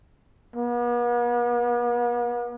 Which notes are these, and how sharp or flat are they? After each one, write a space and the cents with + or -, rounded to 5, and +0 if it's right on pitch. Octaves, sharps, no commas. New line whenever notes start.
B3 -45